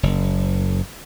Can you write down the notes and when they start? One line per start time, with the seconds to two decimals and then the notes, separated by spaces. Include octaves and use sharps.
0.03 F#1